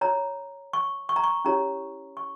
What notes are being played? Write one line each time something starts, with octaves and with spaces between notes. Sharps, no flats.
F4 C#5 A#5
C#6
C#6
A#5
C#6
C#4 E4 G4 C#5 A#5
C#6